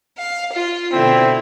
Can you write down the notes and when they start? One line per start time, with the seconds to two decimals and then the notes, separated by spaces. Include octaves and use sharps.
0.18 F5
0.53 F4
0.92 B2 D3 C4 E4